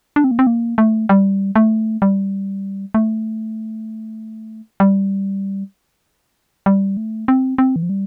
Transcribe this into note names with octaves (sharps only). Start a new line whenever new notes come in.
D4
C4
A#3
C4
A#3
A3
G3
A3
G3
A3
G3
G3
A3
C4
C4
E3
F3
G3